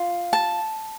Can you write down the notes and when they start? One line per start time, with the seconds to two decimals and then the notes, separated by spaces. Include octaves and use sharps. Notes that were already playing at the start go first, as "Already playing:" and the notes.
Already playing: F4
0.33 A5